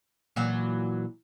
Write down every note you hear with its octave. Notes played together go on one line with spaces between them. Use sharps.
A#2 E3 F#3